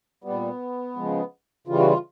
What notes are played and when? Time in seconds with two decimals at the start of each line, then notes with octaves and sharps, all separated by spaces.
0.24 A#2 G3 B3
0.96 C#3 F3 G#3
1.67 C#3 E3 G3 F4
1.80 F#4
1.85 F4